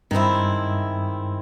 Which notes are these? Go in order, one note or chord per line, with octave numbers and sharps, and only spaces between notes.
G2 D#3 G#3 C4 E4